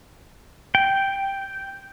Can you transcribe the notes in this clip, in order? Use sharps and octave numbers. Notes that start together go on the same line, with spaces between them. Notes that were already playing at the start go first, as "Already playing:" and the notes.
G5